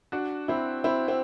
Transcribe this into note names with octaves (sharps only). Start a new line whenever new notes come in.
D4 F#4
C4 E4
C4 E4
C4